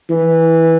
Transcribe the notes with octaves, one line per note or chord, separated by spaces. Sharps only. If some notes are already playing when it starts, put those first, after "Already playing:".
E3